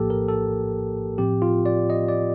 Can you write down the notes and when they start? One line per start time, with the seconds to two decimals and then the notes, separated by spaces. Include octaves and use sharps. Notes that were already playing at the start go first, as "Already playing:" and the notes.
Already playing: A#1 A2 F3 A#3 G4 A4
0.10 A#4
0.28 A4
1.18 A2 F3 C4 G4
1.42 F4
1.66 D5
1.90 D#5
2.08 D5